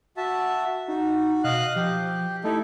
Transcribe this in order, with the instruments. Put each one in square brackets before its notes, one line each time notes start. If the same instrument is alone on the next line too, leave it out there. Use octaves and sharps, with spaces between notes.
[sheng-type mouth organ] F#4 E5 A5
[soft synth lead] D#4 [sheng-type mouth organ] F#4
[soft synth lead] B2 [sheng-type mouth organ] D#5 F5 F#6
[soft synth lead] F3 [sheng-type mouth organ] G4
[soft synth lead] A3 [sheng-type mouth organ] D#4 E4 A4